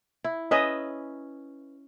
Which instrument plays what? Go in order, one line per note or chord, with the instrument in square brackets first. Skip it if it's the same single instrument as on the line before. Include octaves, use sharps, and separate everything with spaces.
[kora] E4
[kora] C#4 B4 E5 [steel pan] D#5